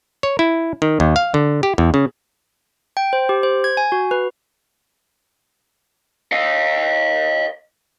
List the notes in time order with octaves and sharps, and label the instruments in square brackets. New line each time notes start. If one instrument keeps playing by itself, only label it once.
[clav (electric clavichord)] C#5
E4
D#3
D#2
F5
D3
G4
E2
C#3
[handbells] G5
C5
G4
C5
G#6
G#5
F#4
B4
[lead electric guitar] D#5 F5